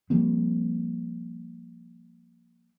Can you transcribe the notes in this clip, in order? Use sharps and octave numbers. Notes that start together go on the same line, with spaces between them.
F3 G3 A#3 C4